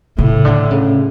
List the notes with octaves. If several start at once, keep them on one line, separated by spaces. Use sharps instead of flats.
A2 C#3
D3
C#3